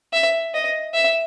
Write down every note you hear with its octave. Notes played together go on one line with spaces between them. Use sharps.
E5
D#5
E5